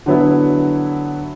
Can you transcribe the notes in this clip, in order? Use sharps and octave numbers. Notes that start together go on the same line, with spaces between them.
D3 F#3 B3 E4